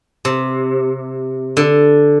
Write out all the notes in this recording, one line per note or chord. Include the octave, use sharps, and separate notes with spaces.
C3
D3